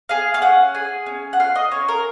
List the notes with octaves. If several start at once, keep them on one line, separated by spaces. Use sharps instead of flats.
G#4 F5
F5
C#4 F#5
G#4 G#5
C#4
F#5
F4 F5
D#5
C#4 C#5
A#4